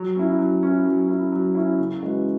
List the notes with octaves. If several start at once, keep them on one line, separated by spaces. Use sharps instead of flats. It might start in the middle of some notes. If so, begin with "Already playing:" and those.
Already playing: F#3
C#4 E4
F#3
C#4 E4
F#3
C#4 E4
F#3
C#4 E4
C#3
E3 G#3 C#4 F#4